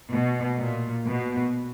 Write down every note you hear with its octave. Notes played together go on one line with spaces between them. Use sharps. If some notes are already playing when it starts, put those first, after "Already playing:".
B2
A#2
B2